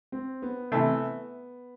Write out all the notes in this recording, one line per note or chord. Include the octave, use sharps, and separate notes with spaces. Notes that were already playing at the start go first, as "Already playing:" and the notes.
C4
B3
C3 E3 A3